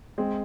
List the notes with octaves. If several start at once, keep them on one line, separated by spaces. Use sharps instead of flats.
G#3 C4